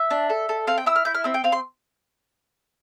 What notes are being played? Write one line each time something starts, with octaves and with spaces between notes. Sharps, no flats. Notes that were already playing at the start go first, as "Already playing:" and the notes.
Already playing: E5
D4
A4
A4
C4 F5
G5
E4 E6
F6
E4 G6
F6
C4 E6
G5
C4 F5
C6